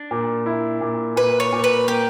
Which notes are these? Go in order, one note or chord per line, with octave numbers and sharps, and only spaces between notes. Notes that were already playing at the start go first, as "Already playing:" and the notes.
Already playing: D4
A#2
E4
A#2
A#2 B4
C#5
A#2
B4
A#3 G4